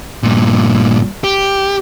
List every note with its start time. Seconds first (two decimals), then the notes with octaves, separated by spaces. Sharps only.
0.23 G2 A#2
1.24 G4